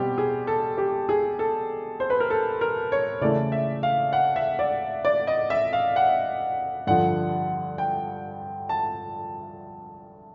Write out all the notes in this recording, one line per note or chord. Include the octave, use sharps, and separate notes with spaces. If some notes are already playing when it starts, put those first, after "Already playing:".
Already playing: B2 G3 C4 G4
G#4
A4
G4
G#4
A4
C5
B4
A#4
A4
A#4
C#5
C#3 E3 A3 D5
E5
F5
F#5
E5
D5
D5
D#5
E5
F5
F#5
G2 D3 F3 F#5
G5
A5